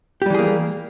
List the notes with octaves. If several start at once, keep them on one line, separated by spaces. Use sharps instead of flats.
E3 G3 A#3 G4 G#4